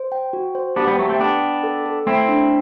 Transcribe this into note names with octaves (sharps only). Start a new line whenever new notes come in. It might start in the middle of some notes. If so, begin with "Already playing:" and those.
Already playing: C5
G5
F#4
C5
B3 D4 G4
G3 B3
F#3 A3 G5
A3 C4
B3 D4 G5
G5
A4
A4
A3 C4 E4
D4